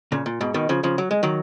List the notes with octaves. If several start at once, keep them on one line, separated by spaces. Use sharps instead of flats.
A#2 C#3
A#2
G#2 B2
B2 D#3
C#3 F3
C#3 F3
F#3
G#3
D#3 F#3